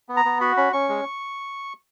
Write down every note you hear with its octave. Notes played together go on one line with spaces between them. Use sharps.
B3
A#5
B3
F#4 B5
C#4 B5
C#4 C#6
G#3